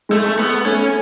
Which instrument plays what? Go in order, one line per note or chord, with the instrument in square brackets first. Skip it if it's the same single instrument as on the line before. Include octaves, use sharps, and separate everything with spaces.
[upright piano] G#3 [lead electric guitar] A3
[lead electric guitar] B3
[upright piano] A3 [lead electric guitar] C#4